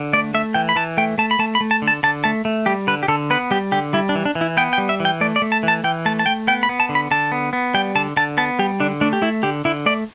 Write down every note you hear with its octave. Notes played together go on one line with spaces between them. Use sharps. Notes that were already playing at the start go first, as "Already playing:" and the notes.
Already playing: D3
A3 D5
A3 E5
E3 G5
B5
E3 A5
A3 G5
A3 A5
B5
A3 A5
B5
A3
A5
D3
A5
D3 A5
A3 A5
A3
G3 G4
D3 B4
G4
D3 A4
B3 B4
G3 G4
D3 G4
G3 E4
D4
E3
D4
E3
E4
B3 G5
G5
G3
E5
E3
G5
A3 D5
D5
A3
A5
E3
A5
E3 G5
A3 A5
A5
A3 G5
B3 G5
B5
B3
A5
D3
B5
D3 A5
B3
B3
G3 G5
D3 A5
D3 A5
B3 A5
G3 G4
D3 D4
A3 D4
G4
A3 E4
D3 G4
D3 E4
A3 D5